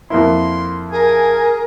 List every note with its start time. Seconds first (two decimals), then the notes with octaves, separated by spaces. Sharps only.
0.10 F2 A#3 E4 C6
0.92 G#4 A#4 G#5